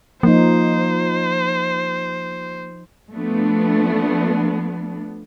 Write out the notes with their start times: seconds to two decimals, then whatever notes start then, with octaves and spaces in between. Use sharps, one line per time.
0.23 F3 A#3 D#4 C5
3.14 F3 A3 B3 D4